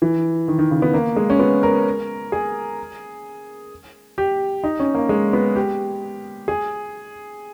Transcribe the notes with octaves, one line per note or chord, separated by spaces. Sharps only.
E3
D#3
D#3
C#3
B3
A#3
G#3
C#4
B3
A#4
G#4
G4
D#4
C#4
A#3
G#3
B3
G4
G#4